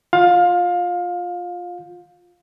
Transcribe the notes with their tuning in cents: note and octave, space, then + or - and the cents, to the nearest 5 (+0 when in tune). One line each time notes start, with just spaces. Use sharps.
F4 +10 F5 +25